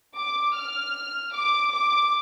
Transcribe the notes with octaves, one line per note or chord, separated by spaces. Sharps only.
D6
F6
D6
D6